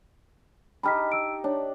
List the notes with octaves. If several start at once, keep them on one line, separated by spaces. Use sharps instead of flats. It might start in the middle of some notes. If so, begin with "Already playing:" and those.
D#4 G4 A5 B5 F6 B6
E6 D7
D4 C#5